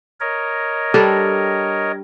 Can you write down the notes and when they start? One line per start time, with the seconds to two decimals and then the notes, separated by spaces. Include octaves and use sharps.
0.20 A#4 C#5 D#5
0.94 G3 D4 A4